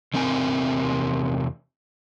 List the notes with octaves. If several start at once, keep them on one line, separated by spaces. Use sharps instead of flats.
E2 C3 C4 A#4 G#5